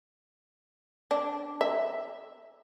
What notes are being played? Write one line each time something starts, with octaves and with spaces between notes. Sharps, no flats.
D4
E5